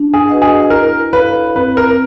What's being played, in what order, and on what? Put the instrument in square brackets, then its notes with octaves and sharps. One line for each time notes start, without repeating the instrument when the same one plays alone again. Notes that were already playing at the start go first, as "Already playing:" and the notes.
Already playing: [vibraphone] D4
[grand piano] G#4
[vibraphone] F#4 B4 D#5 F#5
[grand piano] G#4
[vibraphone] E4 [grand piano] A#4
[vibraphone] A4 C#5 F5 [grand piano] B4
[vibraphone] C4 [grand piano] B4
[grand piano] A#4